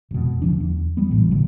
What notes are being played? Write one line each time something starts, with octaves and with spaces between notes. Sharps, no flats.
E1 F2 B2
D2 F3 D4
E2
F#3 G3 B3
A1 A2 E3
B2 D3 F#3